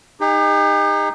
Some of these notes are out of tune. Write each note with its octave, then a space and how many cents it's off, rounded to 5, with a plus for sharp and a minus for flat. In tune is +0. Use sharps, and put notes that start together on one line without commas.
D#4 -10 G4 +45